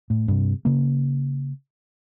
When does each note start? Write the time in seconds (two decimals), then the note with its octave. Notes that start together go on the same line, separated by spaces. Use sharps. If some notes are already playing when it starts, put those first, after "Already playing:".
0.10 A2
0.28 G2 C3
0.65 C#3 A#3